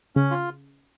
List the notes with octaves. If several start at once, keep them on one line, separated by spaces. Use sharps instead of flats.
C#3 C#4
F4